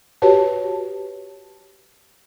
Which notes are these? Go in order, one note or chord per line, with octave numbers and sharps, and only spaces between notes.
F#4 G4 B4 C#5 A5